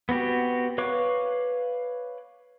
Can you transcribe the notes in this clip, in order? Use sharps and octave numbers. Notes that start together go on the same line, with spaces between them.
B3 C4 F#4 G4
B4 C#5 F5 C#6 D6